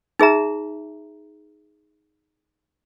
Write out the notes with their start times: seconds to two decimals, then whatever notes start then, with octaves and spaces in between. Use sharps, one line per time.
0.20 D#4 G#4 E5 A#5